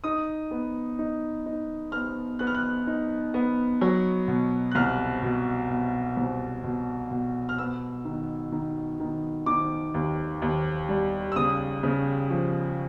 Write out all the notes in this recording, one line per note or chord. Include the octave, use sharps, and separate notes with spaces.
D#4 D#6
B3
D#4
D#4
B3 F6
B3 F#6
F6
F#6
D#4
B3
F#3
B2
F#6
C2 F6
B2
B2
C2
B2
B2
F6
B3 E6
D#3
D#3
D#3
D#3 D6
D#2
D#2
G3
E6
C#3 D#6
C#3
F3